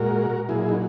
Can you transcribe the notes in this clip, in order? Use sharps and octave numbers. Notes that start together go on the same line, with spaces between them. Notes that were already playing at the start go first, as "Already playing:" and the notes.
Already playing: A#2 G#3 F#4 A#4
A#2 F#3 E4 G#4
D#4